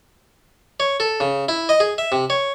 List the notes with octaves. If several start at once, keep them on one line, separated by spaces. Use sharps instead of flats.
C#5
A4
C#3
E4
D#5
G#4
E5
C3
C#5